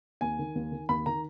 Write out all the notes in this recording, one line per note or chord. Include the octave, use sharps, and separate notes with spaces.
D#2 G#5
D#3
D#2
D#3
D#2 B5
D#3 A#5